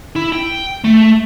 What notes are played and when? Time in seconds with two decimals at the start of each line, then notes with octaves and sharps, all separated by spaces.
0.15 E4
0.32 G5
0.85 A3